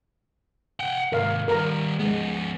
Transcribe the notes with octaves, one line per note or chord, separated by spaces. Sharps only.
F#5 G5
D#2 G#2 A#4 F5
D#3 G3 A#4 A#5
F3 G#3 B3